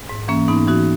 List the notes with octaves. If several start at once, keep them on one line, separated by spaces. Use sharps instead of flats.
G#2
E3 A#3 C#4
G#2 B3 D#4
E3 D#4 F#4